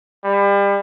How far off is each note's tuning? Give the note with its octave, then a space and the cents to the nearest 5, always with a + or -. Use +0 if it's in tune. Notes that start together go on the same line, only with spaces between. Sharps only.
G3 +35